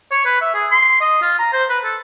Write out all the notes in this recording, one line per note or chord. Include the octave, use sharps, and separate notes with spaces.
C#5
B4
E5
G#4
C6
D#5
F4
A#5
C5
B4
A4